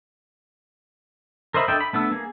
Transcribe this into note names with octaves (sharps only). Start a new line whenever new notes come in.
A#4 C5 D#5 E5 B5
D4 A4 D#5 E5 G5
B5
A3 B3 D4 E6
A#3 G#4